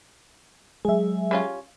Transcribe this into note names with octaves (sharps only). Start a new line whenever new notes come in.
F#3 G#3 G#4 E5
G3 C#4 F4